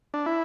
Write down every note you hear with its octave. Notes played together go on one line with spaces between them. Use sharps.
D4
E4